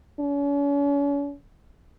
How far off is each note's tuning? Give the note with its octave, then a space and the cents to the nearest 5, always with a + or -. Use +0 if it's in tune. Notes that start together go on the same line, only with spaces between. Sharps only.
C#4 +40